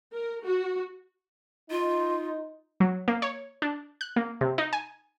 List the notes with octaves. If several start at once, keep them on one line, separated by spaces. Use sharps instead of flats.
A#4
F#4
D#4 F4
F#3
A#3
C#5
D4
F#6
A#3
C3
D#4
G#5